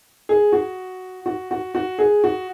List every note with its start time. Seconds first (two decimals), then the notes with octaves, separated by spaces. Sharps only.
0.29 G#4
0.52 F#4
1.26 F#4
1.51 F#4
1.75 F#4
1.99 G#4
2.24 F#4